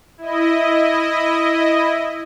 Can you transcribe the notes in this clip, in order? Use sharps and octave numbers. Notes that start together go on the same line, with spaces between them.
E4 D#5